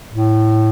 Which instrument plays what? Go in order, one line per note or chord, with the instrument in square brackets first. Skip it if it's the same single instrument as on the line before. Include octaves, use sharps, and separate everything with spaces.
[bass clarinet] A2